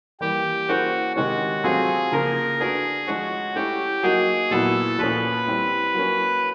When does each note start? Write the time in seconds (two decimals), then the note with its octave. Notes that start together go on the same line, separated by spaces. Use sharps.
0.21 E3 G3 A#3 G4
0.68 A#3 C#4 E4 F#4 G#4 C5
1.16 C3 D#3 G#3 C#4 F#4
1.64 F#3 A3 C4 F4 G#4
2.12 C#3 F3 A#3 A#4
2.60 A3 D4 F#4 G#4 B4
3.07 F3 G#3 C#4 F#4
3.55 A3 C#4 E4 G4
4.03 F#3 A#3 D#4 F#4 G#4
4.50 A#2 F#3 B3 E4 A4
4.98 A#2 F3 A3 C#4 B4
5.46 G3 C4 E4
5.94 F#3 A#3 C#4